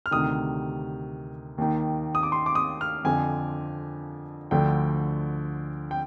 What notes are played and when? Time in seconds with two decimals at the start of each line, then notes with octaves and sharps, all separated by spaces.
0.06 F6
0.11 D2 C3 D#3 D#6
1.58 D#2 D#3
2.15 D#6
2.23 D6
2.32 C6
2.46 D6
2.55 D#6
2.81 F6
3.04 F2 D3 F3 G#5
4.51 D2 D3 F3 G5
5.91 G5